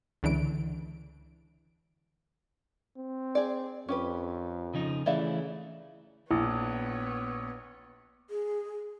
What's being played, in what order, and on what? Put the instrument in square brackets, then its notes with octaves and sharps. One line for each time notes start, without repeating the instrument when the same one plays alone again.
[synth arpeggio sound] C#2 D3 E3 D7
[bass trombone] C4
[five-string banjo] G#4 D5
[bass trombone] F2 [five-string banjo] C#4 G4 B4
[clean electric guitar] C#3 F3 D#4
[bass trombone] C#3 [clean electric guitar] E3 A3 E4 [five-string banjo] D5 E5 F5
[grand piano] A#1 [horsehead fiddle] B3 C#5 [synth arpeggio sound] E4
[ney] G#4